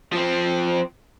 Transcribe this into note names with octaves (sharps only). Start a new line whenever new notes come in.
F3 C4